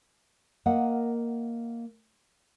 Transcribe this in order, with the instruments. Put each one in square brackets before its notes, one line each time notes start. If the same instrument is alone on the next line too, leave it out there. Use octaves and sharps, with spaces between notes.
[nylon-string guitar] A#3 A#4 D#5 F5 F#5